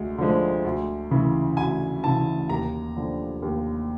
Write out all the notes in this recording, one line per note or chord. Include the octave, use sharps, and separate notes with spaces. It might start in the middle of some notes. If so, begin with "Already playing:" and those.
Already playing: D2 G#3
D3 F3 G#3
D2
C#3 E3
D2 G#5
C#3 E3 A5
D#2 A#5
D3 F3
D#2